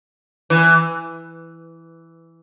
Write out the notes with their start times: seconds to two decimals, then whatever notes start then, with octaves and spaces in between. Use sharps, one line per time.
0.50 E3